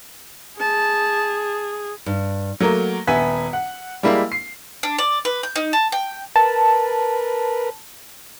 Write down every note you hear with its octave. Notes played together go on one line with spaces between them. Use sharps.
G#4 A5
G2
F#3 A3 A#3 A#4
D#1 B3 E5 G#5 B6
F#5
G3 G#3 A#3 E4 A#4 F5
C7
D4
D5
B4
G6
D#4
A5
G5
A#4 B4 A5